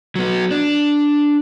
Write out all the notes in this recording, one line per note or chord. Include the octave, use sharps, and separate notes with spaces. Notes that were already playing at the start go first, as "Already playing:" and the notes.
F#3 B3
D4